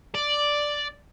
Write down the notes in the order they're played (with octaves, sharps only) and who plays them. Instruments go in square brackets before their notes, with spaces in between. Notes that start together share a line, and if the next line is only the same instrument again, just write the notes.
[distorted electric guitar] D5